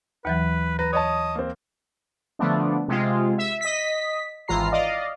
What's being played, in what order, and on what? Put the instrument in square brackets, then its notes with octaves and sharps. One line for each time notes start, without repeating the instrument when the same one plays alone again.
[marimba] D#2 E3 F#3 [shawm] B4
[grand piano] B4 [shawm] A#5
[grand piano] C#5 D#5 A5 [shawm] D#6
[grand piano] A#3 C4
[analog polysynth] D3 F3 A3 B3 D4
C3 G#3 F4
E5
D#5 B6
G#1 E3 F4 A#5 C7
D5 D#5 F5